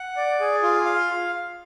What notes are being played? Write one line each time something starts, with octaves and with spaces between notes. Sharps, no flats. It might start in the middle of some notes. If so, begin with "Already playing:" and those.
Already playing: F#5
D5
G#4
F4
F5